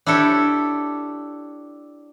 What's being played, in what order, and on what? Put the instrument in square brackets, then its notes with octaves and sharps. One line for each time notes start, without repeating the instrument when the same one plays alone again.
[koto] D4 E4 G4 A4 C#5